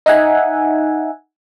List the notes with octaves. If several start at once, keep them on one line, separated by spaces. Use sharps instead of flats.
D#4 E5 F#5 G#5